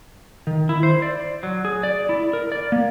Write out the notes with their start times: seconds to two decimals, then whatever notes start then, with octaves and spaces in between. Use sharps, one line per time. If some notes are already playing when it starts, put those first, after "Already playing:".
0.47 D#3
0.69 E4
0.83 C5
1.02 D5
1.43 F#3
1.65 G#4
1.83 D5
2.09 E4
2.33 A#4
2.52 D5
2.72 A#3